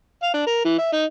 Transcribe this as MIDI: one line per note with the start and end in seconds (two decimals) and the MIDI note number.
0.23 0.30 77
0.34 0.44 62
0.47 0.63 70
0.65 0.77 52
0.78 0.91 76
0.93 1.04 63